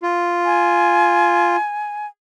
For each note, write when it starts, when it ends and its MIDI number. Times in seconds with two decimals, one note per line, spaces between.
0.03 1.56 65
0.45 2.07 80